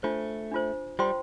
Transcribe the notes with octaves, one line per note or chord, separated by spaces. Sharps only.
A3 D4 F4 C5
D4 F4 C5
G3 F4 C5 G5 C6